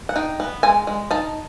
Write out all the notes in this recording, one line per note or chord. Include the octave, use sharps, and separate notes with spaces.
F#5
D#4 G5
B3
G#3 G#5
G#3
D#4 A5